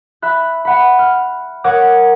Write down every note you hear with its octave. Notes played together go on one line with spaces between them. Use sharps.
E5 B5 F#6
F#5 B5
F6
A#4 C#5 F#5 D6 D#6